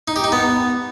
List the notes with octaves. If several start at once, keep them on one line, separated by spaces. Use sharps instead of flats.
D#4
G4
D#4
B3